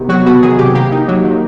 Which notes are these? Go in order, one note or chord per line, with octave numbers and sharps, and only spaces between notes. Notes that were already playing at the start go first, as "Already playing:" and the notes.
Already playing: C3 D#3 B3
F#3 F#4
B3 F#4
D#3 G#4
C3 G4
A#3 G4
D#4
F#3
D#3